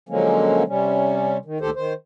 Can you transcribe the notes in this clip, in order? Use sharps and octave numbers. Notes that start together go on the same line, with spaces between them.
D3 F3 F#3 G#3 A#3 C#4
C3 G3 C#4
D#3
D2 A#2 D#3 G4 A4 C5
D#3 C5